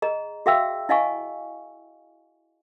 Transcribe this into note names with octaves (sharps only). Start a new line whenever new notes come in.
G#4 D#5 A#5
F#4 G#4 E5 F5 G5 E6
E4 D#5 F5 G#5 C#6